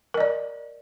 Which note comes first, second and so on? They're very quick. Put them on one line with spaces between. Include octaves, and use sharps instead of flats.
A#4 D#5 D5